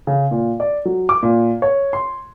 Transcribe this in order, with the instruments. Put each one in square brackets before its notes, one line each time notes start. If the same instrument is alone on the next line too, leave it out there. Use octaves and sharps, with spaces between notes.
[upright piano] C#3
A#2
D5
F#3
D6
A#2
C#5
C6